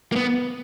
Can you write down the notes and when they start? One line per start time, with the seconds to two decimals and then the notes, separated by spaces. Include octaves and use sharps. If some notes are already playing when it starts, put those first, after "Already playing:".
0.12 A#3
0.16 B3